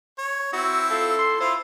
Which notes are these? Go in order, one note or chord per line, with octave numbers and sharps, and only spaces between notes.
C#5
C4 E4 F#4
F4 A4
C6
E4 F4 C5